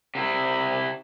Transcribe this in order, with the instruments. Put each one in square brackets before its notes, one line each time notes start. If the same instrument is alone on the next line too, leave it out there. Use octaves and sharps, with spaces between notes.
[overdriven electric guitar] C3 E4